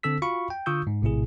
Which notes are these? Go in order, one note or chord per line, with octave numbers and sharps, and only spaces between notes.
D3 C4 A4 E6 B6
F4 F#4 F5 B5 C#6
G5
D3 F4 C#6 D#6 E6 G6
G#2
A#1 A2 C3 E4 G#4